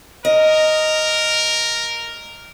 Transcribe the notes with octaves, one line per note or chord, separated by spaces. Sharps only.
A#4 D#5